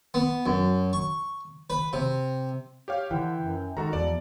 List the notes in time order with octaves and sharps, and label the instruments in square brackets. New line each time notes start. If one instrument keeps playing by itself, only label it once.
[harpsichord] B3
F#2
C#6
B4
C3
[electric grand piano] G4 C#5 F5
[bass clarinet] D3 [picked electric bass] E3 [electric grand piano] G5
[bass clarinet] F#2
[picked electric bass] D#3 [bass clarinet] G#3 [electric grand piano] F#4 A4 A#5
[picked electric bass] E2 [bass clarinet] F3 [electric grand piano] D5